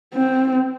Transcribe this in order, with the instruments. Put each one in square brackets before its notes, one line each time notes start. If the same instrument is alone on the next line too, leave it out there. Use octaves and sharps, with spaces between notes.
[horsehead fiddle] C4